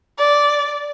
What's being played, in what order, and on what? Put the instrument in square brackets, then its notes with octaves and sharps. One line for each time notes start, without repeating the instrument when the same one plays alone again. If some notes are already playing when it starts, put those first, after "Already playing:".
[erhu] D5